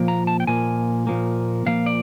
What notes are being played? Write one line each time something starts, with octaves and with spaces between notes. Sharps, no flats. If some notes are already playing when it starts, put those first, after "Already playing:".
Already playing: A#2 F3 A#3
A#5
A5
G5
A#2 F3 A#3 G#5
A#2 F3 A#3
A#2 F3 A#3 F5
D5